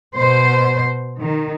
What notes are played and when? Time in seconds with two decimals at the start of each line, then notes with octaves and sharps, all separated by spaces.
0.16 B2 C5
1.20 D#3